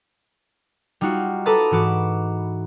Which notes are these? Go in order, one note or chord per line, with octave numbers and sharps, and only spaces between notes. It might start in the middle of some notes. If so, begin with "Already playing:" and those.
G3 D#4 F4 F#4
A4 B4 A#5 D6 D#6 A6
G#2 E3 F#4 D6 E7